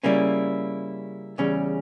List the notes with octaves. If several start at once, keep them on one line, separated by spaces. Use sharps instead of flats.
C#3 G3 A#3 C#4 E4
E2 C#3 G3 C#4